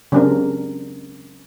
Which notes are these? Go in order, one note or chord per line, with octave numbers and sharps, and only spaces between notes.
C#3 F#3 C4 D4 G4 A#4